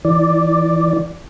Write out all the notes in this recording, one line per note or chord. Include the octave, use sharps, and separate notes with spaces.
E3 D5